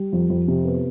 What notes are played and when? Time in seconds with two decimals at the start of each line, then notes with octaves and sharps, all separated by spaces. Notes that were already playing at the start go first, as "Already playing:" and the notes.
Already playing: G3
0.13 F2
0.30 F2
0.48 C3
0.65 B3